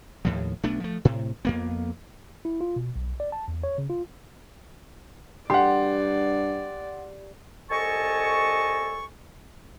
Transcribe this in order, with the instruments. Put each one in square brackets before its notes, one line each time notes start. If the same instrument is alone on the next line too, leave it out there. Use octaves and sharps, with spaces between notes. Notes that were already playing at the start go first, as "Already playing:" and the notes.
[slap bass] D#2 A2 F3
B1 A3 B3 D4
F3 A3
A2 C3
F2 A#3 B3
[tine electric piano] E4
F4
B2
B1
D5
A5
E2
C#5
C#3
F4
[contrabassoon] G2 [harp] G4 [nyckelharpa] D5 [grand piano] F#5 C6
[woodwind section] C2 A4 D#5 G#5 A5 C#6